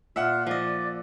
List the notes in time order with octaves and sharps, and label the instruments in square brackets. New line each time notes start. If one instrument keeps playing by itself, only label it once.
[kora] A#2 [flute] F4 [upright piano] E5 F#5
[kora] F3 D#5 [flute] D5